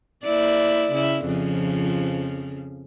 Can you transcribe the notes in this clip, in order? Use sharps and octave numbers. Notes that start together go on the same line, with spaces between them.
A#3 E4 D5
C#3 E4
F2 C#3 F3